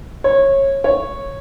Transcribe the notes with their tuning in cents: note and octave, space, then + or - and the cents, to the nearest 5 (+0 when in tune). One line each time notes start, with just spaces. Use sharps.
C#5 -20
C#5 -10